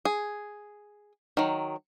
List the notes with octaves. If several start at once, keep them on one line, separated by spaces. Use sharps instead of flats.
G#4
D#3 F#3